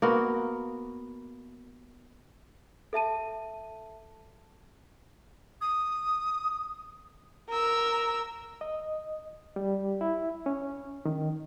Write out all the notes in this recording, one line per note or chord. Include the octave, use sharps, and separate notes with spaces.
A#3 B3 F#4 A#4
A4 E5 A5 D#7
D#6
A#4 E6
D#5
G3
E4
C#4
D#3